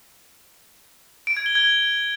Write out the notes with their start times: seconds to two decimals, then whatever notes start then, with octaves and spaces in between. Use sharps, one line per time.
1.27 D7
1.37 G#6
1.46 G7
1.55 G#6